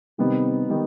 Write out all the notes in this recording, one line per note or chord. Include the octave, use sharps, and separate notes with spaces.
C3 D#3 G3 B3 D#4
D#3 G3 B3 D#4